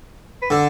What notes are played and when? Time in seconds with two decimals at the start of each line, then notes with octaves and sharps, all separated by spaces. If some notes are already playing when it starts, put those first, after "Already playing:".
0.42 B4
0.50 D3 A4